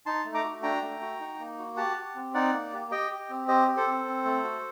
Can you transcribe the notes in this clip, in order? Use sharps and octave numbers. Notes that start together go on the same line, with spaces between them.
D#4 A5 C6
A3
A#5 D6
F#4
D4 G5 A#5
A3
F#4
D#4
A#3
F#4
G4 F#5 A5
G4
C4
D#4 D5 F#5
A#3
G4
G4 D#5 G5
G4
C4
G4 C5 D#5
G4
A4 C5
C4
C4
A3
F#4